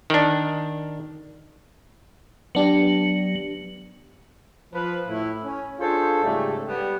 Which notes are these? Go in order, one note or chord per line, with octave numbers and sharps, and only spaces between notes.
D#3 D4
F#3 B3 D4 G4
F3 B4
A2 E4
C#4
D4 F4 G#4 A4 C5 C#5
G#2 C#3 G3 A3
G3 B3